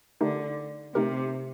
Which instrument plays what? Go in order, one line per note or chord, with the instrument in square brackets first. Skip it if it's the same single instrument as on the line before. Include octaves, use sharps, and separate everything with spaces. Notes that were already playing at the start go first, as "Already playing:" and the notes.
[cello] D3 [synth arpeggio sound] A3 D#4 G4 A#4
[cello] C3 [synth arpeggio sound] A3 D#4 G4 A#4